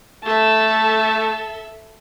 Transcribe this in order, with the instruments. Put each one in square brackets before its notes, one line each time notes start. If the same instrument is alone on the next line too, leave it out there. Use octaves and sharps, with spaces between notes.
[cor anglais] A3 [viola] A4 E5 [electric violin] A5